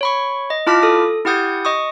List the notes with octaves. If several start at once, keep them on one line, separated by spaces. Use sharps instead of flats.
C#5 B5 C#6
D#5
E4 F4 A5 D6 F6 B6
A4 D#6
E4 G4 F#5 D#6 G6 G#6
D#5 C#6 D#6